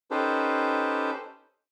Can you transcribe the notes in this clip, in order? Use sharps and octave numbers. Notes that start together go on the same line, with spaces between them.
C#4 D#4 G4 A4 B4 C5